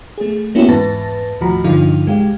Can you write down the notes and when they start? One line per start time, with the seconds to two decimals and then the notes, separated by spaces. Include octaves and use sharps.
0.18 A3 G#4
0.55 A#3 B3 C#4 E4 F#4 G4
0.68 E2 G#2 B4 A5 A6 A#6
1.41 D#2 A2 F3 F#4 A#5 B5
1.64 G2 D3 F3 D#4 F4
2.06 C2 G#3 G4 F5